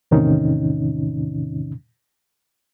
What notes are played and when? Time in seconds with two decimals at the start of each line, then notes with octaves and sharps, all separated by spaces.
0.11 E2 A2 C3 D#3 C#4 D#4